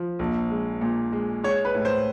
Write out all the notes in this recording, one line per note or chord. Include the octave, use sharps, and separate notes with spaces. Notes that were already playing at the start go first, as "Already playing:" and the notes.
Already playing: F3
A#1
G#3
A#2
G#3
G#3 C#5
B4
A2
C5